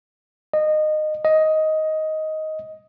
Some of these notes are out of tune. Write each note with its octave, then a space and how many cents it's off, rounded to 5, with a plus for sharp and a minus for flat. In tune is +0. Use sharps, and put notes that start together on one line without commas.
D#5 -20
D#5 +10